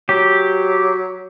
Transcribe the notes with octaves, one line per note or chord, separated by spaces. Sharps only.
F#3 G4